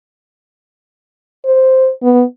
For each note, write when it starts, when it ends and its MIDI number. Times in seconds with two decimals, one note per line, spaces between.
1.45 1.90 72
2.03 2.24 59